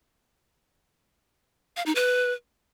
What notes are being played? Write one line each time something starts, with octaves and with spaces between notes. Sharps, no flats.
F5
D#4
B4